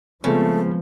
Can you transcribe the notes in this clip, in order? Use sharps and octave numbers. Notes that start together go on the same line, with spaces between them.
C#3 F3 G#3 A3 B3 C4